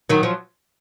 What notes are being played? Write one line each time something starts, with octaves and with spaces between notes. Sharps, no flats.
D#3 F#3
F3